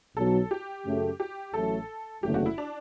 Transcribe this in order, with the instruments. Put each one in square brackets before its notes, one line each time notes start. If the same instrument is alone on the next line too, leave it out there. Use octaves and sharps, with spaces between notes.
[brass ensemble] B1 B2 F#3 [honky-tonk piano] A4
[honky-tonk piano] G4
[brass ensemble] F#2 C#3 F#3 A3
[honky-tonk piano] G4
[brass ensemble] A1 A2 F#3 A3 [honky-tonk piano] A4
[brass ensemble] F#1 E2 D3 F#3 A3 [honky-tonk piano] G4
[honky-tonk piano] F#4
E4
D4